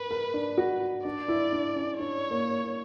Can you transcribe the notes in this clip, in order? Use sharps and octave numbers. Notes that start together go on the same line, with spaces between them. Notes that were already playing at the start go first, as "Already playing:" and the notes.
Already playing: A#4 B4
A#4
D4
F#4
D4 D5
E4
D4
C#4
D4 C#5
A#3
A#3